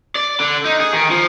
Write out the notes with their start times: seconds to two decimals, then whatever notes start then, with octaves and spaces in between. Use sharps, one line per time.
0.15 D5
0.40 D3
0.65 D#4
0.80 G#4
0.93 D#3
1.10 F3